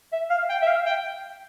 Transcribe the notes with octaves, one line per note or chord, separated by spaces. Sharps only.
E5
F5
G5
E5
F5
G5